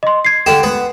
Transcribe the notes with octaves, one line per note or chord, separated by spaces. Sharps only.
D#5 C6
G#6 C7
D3 G4 E7
B3